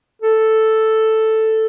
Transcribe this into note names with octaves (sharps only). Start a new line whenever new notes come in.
A4